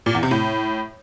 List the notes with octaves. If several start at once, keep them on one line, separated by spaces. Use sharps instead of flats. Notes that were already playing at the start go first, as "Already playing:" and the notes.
A#2
E2
C3
A2